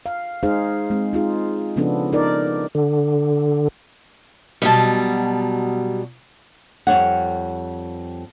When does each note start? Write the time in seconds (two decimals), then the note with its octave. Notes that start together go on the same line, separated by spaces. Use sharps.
0.06 F5
0.43 G#3 D#4 G#4 C5 F5
0.90 G#3 C4
1.13 D#4 F4 G#4
1.76 C#3 F3 B3 C#4 D4 A4
2.13 D#4 A#4 D5
2.75 D3
4.62 B2 F#3 G3 D#5 A5
6.87 F2 G3 C#5 F#5